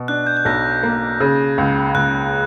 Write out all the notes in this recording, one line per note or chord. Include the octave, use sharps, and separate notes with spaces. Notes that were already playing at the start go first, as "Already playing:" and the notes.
Already playing: B2
D4 F#6
G6
G6
B1 A#6
A#3
C#3
C#2
C#2 F#6